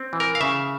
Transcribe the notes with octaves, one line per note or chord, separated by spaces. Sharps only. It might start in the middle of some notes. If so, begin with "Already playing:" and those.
Already playing: C4
E3
A#4
F5
C#3 E5